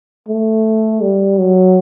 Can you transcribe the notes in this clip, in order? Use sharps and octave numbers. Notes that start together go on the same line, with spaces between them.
A3
G3
F#3